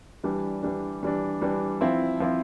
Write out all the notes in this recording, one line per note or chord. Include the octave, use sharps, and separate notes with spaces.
E3 G3 D4
E3 G3 D4
E3 G3 D4
E3 G3 D4
F3 C4 E4
F3 C4 E4